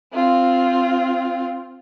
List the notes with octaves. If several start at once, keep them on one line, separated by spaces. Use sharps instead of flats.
C4 F4